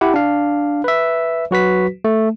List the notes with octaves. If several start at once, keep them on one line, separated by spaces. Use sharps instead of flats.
E4 G4 F#5
D4 F5
B4 E5
F#3 F#4 B4 B6
A3